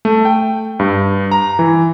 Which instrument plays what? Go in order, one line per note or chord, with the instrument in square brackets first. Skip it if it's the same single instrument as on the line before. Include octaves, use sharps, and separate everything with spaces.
[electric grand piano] A3
G5
G2
A#5
E3